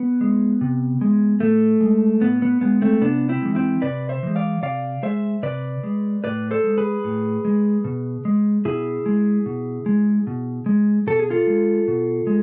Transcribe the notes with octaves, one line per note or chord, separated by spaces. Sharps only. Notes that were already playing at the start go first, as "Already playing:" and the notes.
Already playing: B3
G#3
C3
G#3
A2 A3
G#3
A2 B3
B3
G#3 B3
A3 C4
C3 B3 D4
C4 E4
E3 G#3
C4 E4
C3 B4 D5
C5 E5
E3 G#3
D5 F5
C3 D5 F5
G#3 C5 E5
C3 B4 D5
G#3
A2 B4 D5
A4 C5
G#3
G#4 B4
A2
G#3
B2
G#3
B2 E4 G#4
G#3
B2
G#3
B2
G#3
B2 A4
G#4
F4 A4
G#3
B2
G#3